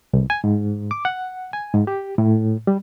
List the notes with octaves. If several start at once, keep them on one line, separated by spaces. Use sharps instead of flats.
C2
G#5
G#2
D6
F#5
G#5
G#2
G4
A2
G3